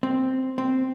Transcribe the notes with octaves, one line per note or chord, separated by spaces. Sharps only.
C4
C4